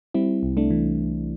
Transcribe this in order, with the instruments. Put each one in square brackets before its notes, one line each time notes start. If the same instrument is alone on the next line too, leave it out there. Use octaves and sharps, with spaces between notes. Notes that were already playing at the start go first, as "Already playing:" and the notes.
[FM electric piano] G3 C4 E4
C2
A3 D4
E3